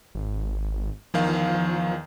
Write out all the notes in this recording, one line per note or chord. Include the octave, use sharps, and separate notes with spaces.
G#1
E2 D#3 F3 F5